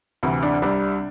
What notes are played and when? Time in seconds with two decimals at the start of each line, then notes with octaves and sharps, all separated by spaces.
0.23 D2 C3 E3
0.43 D4
0.62 C2 C3 G3 D4